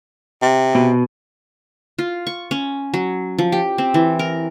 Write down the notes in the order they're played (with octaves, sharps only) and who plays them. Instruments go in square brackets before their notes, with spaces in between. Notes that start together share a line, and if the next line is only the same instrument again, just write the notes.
[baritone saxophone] C3
[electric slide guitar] B2
[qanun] F4
C#6
C#4
F#3
F3
G4
C4
E3
A#4